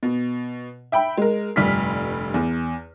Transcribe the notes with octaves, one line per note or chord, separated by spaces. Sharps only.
B2
E5 G5 B5
G#3 A#4
F1 G2 D3 F6 B6
E2